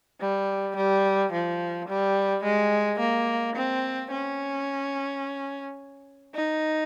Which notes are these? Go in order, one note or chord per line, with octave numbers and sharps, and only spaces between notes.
G3
G3
F3
G3
G#3
A#3
C4
C#4
D#4